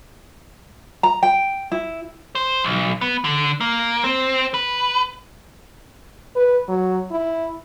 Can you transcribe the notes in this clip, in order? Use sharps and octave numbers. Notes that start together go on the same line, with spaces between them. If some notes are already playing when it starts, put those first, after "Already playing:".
A#5
G5
E4
C5
B1
B3
D3
A#3
C4
B4
B4
F#3
E4